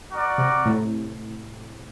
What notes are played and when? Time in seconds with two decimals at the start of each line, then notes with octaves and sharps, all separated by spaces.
0.11 F#4 A#4 D5
0.38 C3
0.66 A2